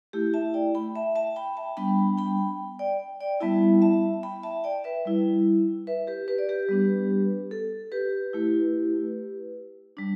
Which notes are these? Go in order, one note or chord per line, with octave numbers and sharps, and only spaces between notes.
A3 E4 G4
E5 A5
D5 G5
G5 B5
E5 A5
E5 A5
G5 B5
E5 A5
G3 B3 D4 G5 B5
G5 B5
D5 G5
D5 G5
G3 B3 E4 E5 A5
E5 A5
G5 B5
E5 A5
D5 G5
B4 E5
G3 E4
B4 E5
G4 B4
G4 B4
D5
G4 B4
G3 B3 D4
A4
G4 B4
A3 E4
G3 D4